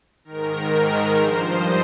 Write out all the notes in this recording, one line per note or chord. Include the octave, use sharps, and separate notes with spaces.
G#2 D#3 A#4
A#4
A#4
G2 F3 C5
D#5